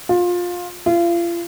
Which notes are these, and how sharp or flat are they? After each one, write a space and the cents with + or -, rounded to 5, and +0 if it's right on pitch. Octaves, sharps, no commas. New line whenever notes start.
F4 +20
F4 -35